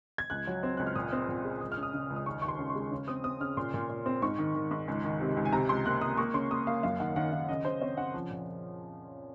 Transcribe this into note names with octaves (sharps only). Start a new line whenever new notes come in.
G#6
C#2 F#6
F#3
C4
C#2 F#6
F6
A#2 D#6
C4
A#2
G#3
C#2 D#6
F6
C#3
D#6
C#3
C#2
D#6
D#2 C#6
D#2 C#6
C6
C#3
C#6
G#3
C#3
C4 D#6
C4 D#6
C#3 F6
A#2 C6
A#2
A#2
C4
G#2 C#6
D#3
D#3
G#2
C#2
D#3
C3
C#2
G#5
C3 A#5
C#2 C6
A#3 F#6
C3 D#6
A#3 C#6
C#3 C6
A#3 D#6
A#3 F5
F#2 F5
D#3 F#5
D#3 F#5
D#3 F5
C#3 D#5
C#3 C5
C4 C#5
C#3 F#5
F3
A#2